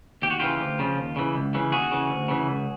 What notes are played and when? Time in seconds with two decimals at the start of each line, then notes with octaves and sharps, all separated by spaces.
0.22 D#2 G4
0.30 F#4
0.40 C#3 E3 F4 G4
0.60 D2
0.79 C#3 F3
0.97 D#2
1.16 C#3 E3
1.36 C#2
1.54 C#3 E3
1.72 D#2 F#4 G#4
1.91 C#3 E3
2.10 D2
2.28 C#3 E3
2.47 C#2